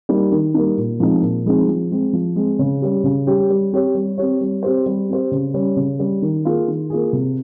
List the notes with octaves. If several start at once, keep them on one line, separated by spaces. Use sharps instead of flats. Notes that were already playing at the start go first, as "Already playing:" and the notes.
G3 A#3 D#4
D#3
G3 A#3 D#4
A#2
F3 G#3 C4 D#4
A#2
F3 G#3 C4 D#4
F3
G#3 C4
F3
G#3 C4
C#3
G3 C#4 G4
C#3
G3 C#4 G4
G3
C4 G4 C#5
G3
C4 G4 C#5
G3
C4 G4 C5
G3
C4 G4 C5
C#3
G3 C#4
C#3
G3 C#4
D#3
A#3 F4 G#4
D#3
A#3 F4 G#4
C3